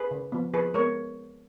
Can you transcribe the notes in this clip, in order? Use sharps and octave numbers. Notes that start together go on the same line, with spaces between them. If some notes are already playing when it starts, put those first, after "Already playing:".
Already playing: G#4 B4
C#3
F3 B3
F3 G#4 B4
G#3 B3 A#4 C#5